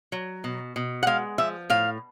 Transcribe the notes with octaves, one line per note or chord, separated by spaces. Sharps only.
F#3
B2
B2
F#5
G#3 F5
F3 E5
A2 F5